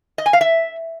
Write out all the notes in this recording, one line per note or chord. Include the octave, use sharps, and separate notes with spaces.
D#5
G#5
F5
E5